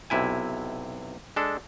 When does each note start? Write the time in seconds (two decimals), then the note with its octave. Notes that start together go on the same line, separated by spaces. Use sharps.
0.10 B1 C3 E4 G#5
1.36 G#3 D4 A4